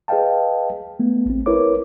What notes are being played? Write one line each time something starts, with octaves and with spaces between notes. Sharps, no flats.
G#4 B4 D#5 F5 G5 A5
A3 B3
A1 C4
E4 A#4 B4 C#5 D6